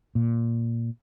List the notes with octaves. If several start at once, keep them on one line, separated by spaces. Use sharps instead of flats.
A#2